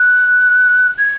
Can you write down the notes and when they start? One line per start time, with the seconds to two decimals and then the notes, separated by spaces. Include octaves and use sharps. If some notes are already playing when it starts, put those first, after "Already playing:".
Already playing: F#6
0.99 G#6